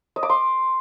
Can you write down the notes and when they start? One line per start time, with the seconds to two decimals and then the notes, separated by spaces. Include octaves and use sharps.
0.16 D#5
0.23 D6
0.29 C6